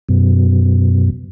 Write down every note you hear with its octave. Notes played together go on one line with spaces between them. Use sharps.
F#2 B2